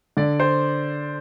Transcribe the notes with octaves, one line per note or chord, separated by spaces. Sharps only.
D3 D5
C5